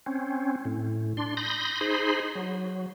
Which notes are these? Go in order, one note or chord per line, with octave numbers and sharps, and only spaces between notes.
C4 C#4
A2
D4 C6
B5 C6 D#6 G6 A#6
D#4 G#4 C5 B5 C6
F#3